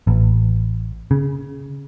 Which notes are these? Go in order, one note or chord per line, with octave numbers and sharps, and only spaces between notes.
A1
C#3